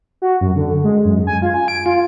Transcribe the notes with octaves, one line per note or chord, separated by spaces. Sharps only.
F#4
F#2
D3
G#3
F#2
G#5
F4
G#5
D7
F4